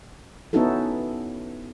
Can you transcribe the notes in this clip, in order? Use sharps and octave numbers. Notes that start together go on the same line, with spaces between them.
B3 C#4 D#4 E4 F#4 A4